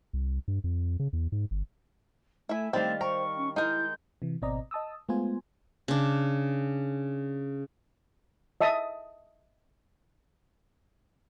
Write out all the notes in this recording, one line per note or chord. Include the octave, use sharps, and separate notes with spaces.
C2
G2
F2
C#3
E2
G#2
G1
A3 E4 E5 G#5
D#3 G3 A3 C4 D4 F5 A6
A#4 C5 A#5 C#6
C#4
G#3 D#4 E4 A#4 G6
C3 E3
G#1 B2 C4 D5 D#5 A#5
D#5 A5 D#6 E6
G#3 A3 B3 F4 C5 G#5
C#3 D4
D#5 E5 A5 D#6